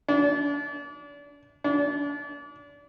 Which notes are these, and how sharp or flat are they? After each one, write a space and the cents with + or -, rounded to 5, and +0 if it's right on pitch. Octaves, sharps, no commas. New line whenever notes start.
D4 -35
D4 -35